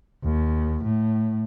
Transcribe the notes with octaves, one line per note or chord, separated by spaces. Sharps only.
D#2
A2